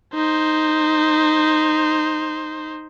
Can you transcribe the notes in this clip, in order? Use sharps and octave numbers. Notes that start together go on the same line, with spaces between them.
D#4 C5